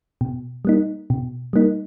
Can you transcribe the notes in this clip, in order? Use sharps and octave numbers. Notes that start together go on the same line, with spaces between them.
B2
G3 A#3 D#4
B2
G3 A#3 D#4